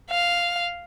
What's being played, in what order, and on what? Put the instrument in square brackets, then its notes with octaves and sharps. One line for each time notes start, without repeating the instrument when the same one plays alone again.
[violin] F5